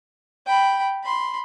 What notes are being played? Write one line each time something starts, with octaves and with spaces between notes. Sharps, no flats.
G5 B5
B5 C6